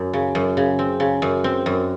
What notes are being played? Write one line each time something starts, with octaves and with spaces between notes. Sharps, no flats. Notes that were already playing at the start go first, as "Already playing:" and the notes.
Already playing: F#2 F#3
C#3
F#2
C#3
C4
C#3
F#2
C4
F#2